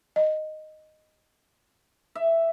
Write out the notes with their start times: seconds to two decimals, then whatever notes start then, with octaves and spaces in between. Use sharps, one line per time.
0.16 D#5
2.15 E5